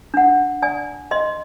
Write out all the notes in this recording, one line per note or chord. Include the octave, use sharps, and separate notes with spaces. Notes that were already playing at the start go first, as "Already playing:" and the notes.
D4 F#5
D5 G#5
D#5 C6